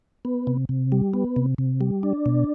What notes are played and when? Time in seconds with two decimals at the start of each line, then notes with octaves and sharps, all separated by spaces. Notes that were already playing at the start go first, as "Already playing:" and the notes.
0.25 B3
0.47 C3
0.69 C3
0.92 G3
1.14 B3
1.36 C3
1.58 C3
1.81 G3
2.03 D4
2.26 B2